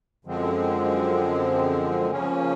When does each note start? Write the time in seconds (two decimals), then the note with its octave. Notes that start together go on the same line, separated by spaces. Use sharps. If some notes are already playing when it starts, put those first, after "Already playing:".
0.25 F#2 D3 F3 G#3 C4
2.11 C#3 F3 A#3 C#4